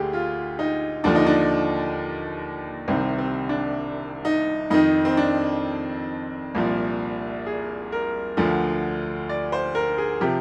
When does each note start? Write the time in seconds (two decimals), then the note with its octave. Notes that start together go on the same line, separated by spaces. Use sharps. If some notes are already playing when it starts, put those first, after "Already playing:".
Already playing: D2 D3 G4 G#4
0.13 F4
0.59 D#4
1.04 D#2 D3 F3 D4
1.15 D#4
1.26 D4
2.88 C2 C3 D#3 C4
3.18 C4
3.49 D4
4.25 D#4
4.70 F2 D#3 D#4
5.05 C4
5.17 D4
6.55 C2 A#2 F3
7.46 G#4
7.92 A#4
8.37 D2 D3 F3
9.29 D5
9.52 C5
9.75 A#4
9.98 G#4
10.21 C3 F3 G4